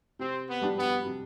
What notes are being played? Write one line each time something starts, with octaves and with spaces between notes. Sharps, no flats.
C3 C4
B3
G3 D4 G4
B3
C3